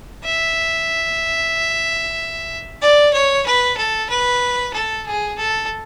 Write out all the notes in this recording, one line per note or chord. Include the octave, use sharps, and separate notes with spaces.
E5
D5
C#5
B4
A4
B4
A4
G#4
A4